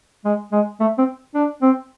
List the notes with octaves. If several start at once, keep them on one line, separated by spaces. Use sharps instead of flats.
G#3
G#3
A3
C4
D4
C4